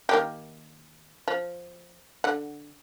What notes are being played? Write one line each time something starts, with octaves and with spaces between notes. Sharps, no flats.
D#3 A#3 G4
F3
D3 F#5